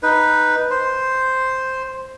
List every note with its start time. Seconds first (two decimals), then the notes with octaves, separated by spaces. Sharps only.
0.03 D#4 B4
0.70 C5